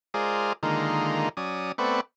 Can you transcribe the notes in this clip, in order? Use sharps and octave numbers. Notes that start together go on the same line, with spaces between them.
G#3 F4 G#4 A#4 C5 D5
D3 D#3 G#3 A#3 D#4 F4
F#3 C#4 D5 D#6
A3 B3 C4 B4 D5 C#6